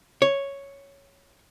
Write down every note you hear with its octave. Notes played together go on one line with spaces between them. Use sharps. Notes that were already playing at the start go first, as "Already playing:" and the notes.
C#5